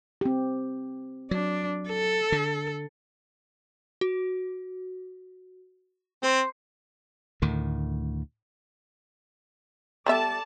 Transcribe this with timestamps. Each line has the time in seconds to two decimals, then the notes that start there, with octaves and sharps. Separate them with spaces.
0.21 C4 G4
1.31 F#3 D4
1.89 A4
2.32 D3
4.01 F#4
6.23 C4 C5
7.42 D2 A2 D#3
10.06 G3 B3 A4 D5 E5 A5